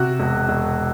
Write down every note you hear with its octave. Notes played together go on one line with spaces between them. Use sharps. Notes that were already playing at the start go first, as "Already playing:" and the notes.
Already playing: C3 F#4
E1
E1